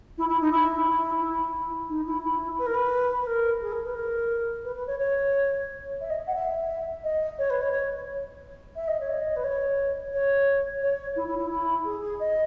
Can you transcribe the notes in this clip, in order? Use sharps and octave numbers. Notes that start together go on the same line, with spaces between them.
E4
E4
D#4
E4
E4
E4
D#4
E4
E4
B4
A#4
B4
B4
A#4
G#4
A#4
B4
A#4
B4
B4
C#5
C#5
E5
D#5
F#5
E5
D#5
C#5
B4
C#5
C#5
E5
D#5
C#5
D#5
B4
C#5
C#5
C#5
E4
E4
E4
E4
G#4
G#4
D#5